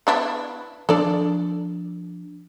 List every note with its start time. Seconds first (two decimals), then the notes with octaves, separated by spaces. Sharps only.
0.07 B3 D4 E4
0.89 F3 D4 A4 D5